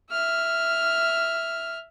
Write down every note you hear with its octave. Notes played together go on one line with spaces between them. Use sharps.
E5 F6